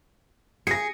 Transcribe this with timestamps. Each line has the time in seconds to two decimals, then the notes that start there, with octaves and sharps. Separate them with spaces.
0.67 G#4 A#6 C#7